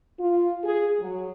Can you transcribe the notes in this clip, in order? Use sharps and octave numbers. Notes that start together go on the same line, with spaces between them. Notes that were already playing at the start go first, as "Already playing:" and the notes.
F4
G#4
F#3